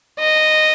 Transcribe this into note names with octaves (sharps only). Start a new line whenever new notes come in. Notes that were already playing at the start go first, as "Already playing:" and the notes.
D#5